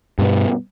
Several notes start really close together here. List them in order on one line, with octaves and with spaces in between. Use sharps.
G2 B2 B3